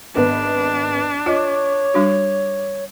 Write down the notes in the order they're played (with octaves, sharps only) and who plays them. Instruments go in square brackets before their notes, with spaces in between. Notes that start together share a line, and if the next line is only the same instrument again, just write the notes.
[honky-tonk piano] G#1 B3 B4 [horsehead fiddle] D4
[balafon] F4 D#5 [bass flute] C#5 [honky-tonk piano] D6
[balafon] G3 D4 F#4